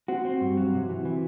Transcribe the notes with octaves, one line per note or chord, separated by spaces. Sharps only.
C4 F#4
C4
G2
F#3
C3
E3
E3